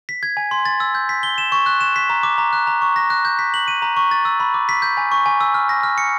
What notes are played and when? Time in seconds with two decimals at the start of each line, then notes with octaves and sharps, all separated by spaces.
0.09 B6
0.23 G#6
0.37 G#5
0.51 C6
0.65 A6
0.80 E6
0.95 G6
1.09 B6
1.23 G7
1.38 E7
1.52 C#6
1.66 F#6
1.81 E7
1.96 B6
2.10 A#5
2.23 D6
2.38 A#5
2.53 F#6
2.67 A#5
2.82 C#6
2.96 A#6
3.10 F#6
3.25 G6
3.39 B6
3.54 F#7
3.68 D#7
3.82 A#5
3.97 C#6
4.11 A6
4.25 E6
4.40 B5
4.54 D6
4.69 B6
4.82 G6
4.97 G#5
5.12 C#6
5.26 G#5
5.41 E6
5.54 F6
5.69 A#6
5.83 F6
5.98 C#7